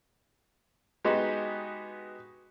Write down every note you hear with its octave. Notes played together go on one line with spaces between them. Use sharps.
G#3 B3 D#4 F#4 G4